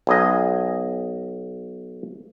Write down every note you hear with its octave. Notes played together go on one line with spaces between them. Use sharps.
B1 G#4 D#5